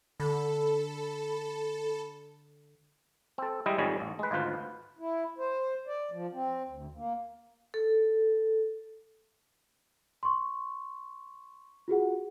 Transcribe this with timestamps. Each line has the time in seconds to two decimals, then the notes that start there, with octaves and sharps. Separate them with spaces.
0.20 D3 A4 B5
3.38 C4 A4
3.66 G3 G#3 E4 D#5 G5
3.78 G#1 F2 D#3 G3 C#5 G#5
4.00 A1
4.19 G#3 B4
4.31 G#1 D2 F4 B4 C5
4.99 E4
5.38 C5
5.87 D5
6.11 F3
6.33 C4
6.69 D2
6.97 A#3
7.74 A4
10.23 C6 C#6
11.88 F4 F#4 G#4 F#5